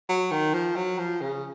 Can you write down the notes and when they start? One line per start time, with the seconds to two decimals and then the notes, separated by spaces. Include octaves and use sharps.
0.09 F#3
0.31 D#3
0.54 F3
0.76 F#3
0.98 F3
1.21 C#3